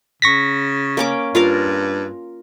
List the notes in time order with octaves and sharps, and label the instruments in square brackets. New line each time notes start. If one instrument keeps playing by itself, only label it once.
[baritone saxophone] C#3 [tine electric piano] C#6 A#6 B6
[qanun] A#3 C#4 D6
[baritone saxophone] G2 [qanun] F4 A#4 F5